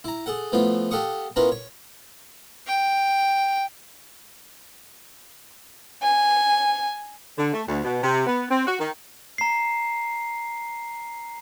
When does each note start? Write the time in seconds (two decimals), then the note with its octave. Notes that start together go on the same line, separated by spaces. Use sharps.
0.04 E4 A#5
0.26 G#4 A4 F#5
0.52 E3 F3 A3 B3 F4
0.91 G4 A4 F5 F#5 C#6 D#6
1.36 B3 C#4 E4 F4 A#4 B4
1.52 C#5
2.67 G5
6.02 G#5
7.38 D3
7.53 A3
7.68 D2
7.84 B2
8.03 C3
8.27 B3
8.51 C4
8.67 F#4
8.80 D#3
9.38 A#5 C7